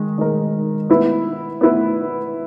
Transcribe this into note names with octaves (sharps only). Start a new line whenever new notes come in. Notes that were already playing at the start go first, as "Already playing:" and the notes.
Already playing: D#3 G#3
D#3 G#3 D#4 A#4
B3 E4 B4
B3 E4 B4